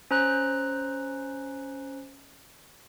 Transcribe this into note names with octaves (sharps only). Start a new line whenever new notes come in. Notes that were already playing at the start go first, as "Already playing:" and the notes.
C#4 C5 A#5 F#6